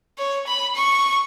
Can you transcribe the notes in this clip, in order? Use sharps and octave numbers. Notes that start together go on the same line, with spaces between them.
C#5
B5
C#6